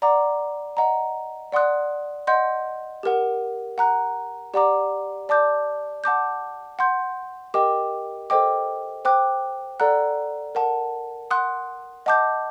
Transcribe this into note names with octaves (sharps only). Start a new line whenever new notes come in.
D5 F#5 A#5 D6
D#5 F#5 A#5
D5 F#5 C6 D#6 F#6
D#5 F#5 C6 G6
G4 A#4 F#5
F#5 A#5 F#6
G4 D5 F#5 A#5 D6
D5 A5 D6 G6
F#5 A5 D6 G6
F#5 C6 G6
G4 A#4 D#5 G5 D6
A4 C5 D#5 G5 D6
C5 G5 D6 F#6
A4 D5 F#5 A#5 F#6
A#4 F#5 A5
F#5 C6 D#6 F#6
D#5 F#5 A5 D6 G6